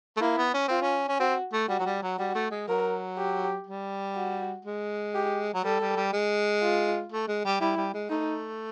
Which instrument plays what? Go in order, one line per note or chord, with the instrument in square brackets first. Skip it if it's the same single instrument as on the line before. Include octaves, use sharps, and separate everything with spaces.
[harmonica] A3
[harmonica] A#3 [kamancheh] E4
[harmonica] B3
C#4
[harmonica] C4 [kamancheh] F4
[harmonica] C#4
C#4
[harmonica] C4 [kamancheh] F#4
[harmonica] A3
[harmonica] G3 [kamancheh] F#4
[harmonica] F#3
G3
F#3
[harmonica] G3 [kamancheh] F#4
[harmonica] A3
G#3
[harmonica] F#3 [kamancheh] A#4
[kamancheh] G4
[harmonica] G3
[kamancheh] F#4
[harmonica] G#3
[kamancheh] G4
[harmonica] F#3
[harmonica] G3 [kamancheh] A4
[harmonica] G3
G3
G#3
[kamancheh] F4
[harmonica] A3
G#3
G3
[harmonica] G3 [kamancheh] E4
[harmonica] G3
G#3
[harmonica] A3 [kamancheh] D#4